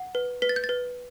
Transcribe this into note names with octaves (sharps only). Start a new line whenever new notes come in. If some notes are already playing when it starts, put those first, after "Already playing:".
Already playing: F#5
B4
B4 B6
A6
G6
A6
B4